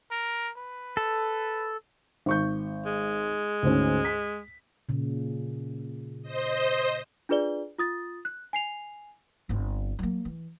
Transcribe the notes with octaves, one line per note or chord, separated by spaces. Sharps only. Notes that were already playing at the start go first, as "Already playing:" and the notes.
A#4
B4
A4
G#1 C#6 G6
G#3
D2 G#2 C#4
B6
A#2 C#3
C5 D#5
D4 F4 G#4 B4 D5 G7
F4 D#6 A6
F#6
G#5 C7 F7
G1 C4
F#3 A#3
E3